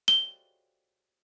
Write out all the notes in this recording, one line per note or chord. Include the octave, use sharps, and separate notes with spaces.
G7